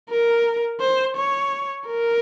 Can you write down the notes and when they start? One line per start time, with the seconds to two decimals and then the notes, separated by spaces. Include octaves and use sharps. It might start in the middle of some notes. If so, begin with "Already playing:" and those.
0.10 A#4
0.80 C5
1.17 C#5
1.87 A#4